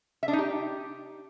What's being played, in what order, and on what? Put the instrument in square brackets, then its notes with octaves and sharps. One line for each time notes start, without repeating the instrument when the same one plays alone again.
[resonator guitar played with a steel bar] E5
D4
D#4
G4